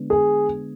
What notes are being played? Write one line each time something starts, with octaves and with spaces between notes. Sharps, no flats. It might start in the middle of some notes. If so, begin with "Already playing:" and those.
Already playing: D3 G#3 B3 D4
G#4